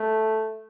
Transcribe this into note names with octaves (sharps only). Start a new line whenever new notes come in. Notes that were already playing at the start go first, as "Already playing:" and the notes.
Already playing: A3